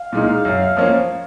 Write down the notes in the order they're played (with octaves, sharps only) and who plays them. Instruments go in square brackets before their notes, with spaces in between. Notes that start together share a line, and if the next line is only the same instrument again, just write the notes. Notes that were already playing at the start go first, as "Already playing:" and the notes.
Already playing: [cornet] F5
[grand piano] A#2 G#3 D#4
F#2
F3 A#3 C#4